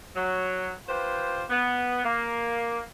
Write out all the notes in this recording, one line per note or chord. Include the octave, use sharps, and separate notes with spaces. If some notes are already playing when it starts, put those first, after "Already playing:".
F#3
F4 G4 B4 C5
B3
A#3